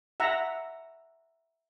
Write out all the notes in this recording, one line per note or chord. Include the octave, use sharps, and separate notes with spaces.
E5 F#5 A#5